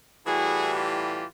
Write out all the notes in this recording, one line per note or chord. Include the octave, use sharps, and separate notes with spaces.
A2 E3 G3 F#4 G#4
F4 G4